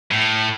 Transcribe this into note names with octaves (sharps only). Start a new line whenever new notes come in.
A2